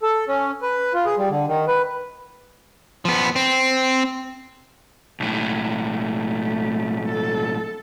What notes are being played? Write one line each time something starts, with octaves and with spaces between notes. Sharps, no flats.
A4
C#4
B4
F4
G#4
G3
D3
D#3
B4
F3 B3
C4
B1 A2
A3
A4